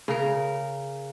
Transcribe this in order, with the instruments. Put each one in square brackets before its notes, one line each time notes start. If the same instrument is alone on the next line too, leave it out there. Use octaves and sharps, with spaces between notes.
[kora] C#3 A#4